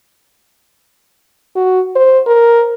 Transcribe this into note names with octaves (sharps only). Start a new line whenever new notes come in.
F#4
C5
A#4